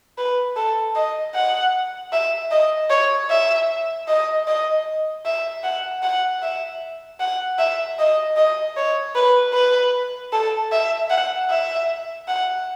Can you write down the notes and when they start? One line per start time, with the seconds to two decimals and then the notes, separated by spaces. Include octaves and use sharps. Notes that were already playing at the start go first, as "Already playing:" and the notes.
0.18 B4
0.56 A4
0.96 D#5
1.35 F#5
2.13 E5
2.51 D#5
2.90 C#5
3.30 E5
4.08 D#5
4.47 D#5
5.26 E5
5.64 F#5
6.03 F#5
6.42 E5
7.20 F#5
7.59 E5
7.99 D#5
8.37 D#5
8.77 C#5
9.15 B4
9.54 B4
10.33 A4
10.72 E5
11.10 F#5
11.50 E5
12.28 F#5